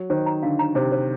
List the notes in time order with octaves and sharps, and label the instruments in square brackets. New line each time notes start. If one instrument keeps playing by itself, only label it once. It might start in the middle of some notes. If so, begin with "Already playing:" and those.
Already playing: [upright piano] F#3
[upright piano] D#3 [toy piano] C5
[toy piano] A#5
[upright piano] D3 [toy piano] F5
[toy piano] A#5
[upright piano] C3 [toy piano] C5
[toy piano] C5